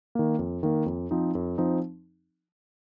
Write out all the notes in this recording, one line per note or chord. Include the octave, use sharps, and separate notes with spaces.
D#3 A#3
F2
D#3 A#3
F2
F3 C4 D#4
F2
F3 C4 D#4